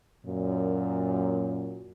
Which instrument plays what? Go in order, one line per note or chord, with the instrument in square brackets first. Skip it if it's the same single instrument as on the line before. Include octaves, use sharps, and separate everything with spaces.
[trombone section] F#2 A#2